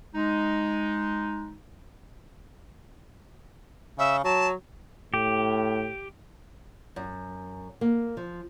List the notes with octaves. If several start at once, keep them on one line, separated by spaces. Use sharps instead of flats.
G#3 D#4
C#3 E5
F#3 A5
A2 G4
F#2
A#3
F3